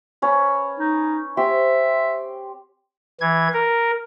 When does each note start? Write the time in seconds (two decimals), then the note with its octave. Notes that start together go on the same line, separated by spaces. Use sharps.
0.22 C#4 B4
0.79 D#4
1.37 C4 G4 E5 C6
3.21 E3 G#6
3.54 A#4